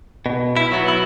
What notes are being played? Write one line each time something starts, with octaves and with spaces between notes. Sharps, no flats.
B2
E4
F#3 B3 E4
E4